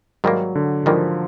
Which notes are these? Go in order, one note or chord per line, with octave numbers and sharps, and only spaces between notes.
G#2 D#3 F#3 G3 A#3
D3
G#2 D#3 F3 G3 A#3